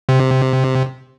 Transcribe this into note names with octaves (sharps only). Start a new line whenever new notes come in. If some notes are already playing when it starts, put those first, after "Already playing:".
C3